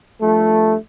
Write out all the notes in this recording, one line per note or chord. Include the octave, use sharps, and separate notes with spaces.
G2 F3 A3